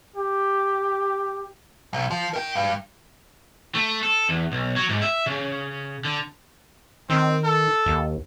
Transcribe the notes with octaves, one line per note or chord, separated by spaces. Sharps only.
G4
B1
F3
A#4 G5
G2
A3
A4
E2
B1
F#3
G#2
E5
C#3
D3
D#3 C4
A4
D#2